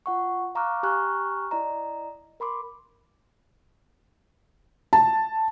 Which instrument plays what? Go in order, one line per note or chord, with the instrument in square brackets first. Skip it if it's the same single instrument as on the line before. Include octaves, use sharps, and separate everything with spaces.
[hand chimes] F4 F#5 C#6
F5 A#5 C#6 D6 F6 F#6
G4 G#5 A#5 C#6 F6 F#6
E4 D5 D#5 A#5
A#4 B5 C6 D6
[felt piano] A5